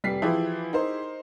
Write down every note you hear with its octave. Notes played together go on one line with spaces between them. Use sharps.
F1 G3 B6 C7
E3 F3 E4 G4 G#4
D#4 A#4 C5